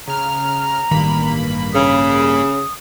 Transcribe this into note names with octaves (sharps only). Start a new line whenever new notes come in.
C#3 A#5 F6
A1 G2 D#3 A#3 B5
C#3 D#6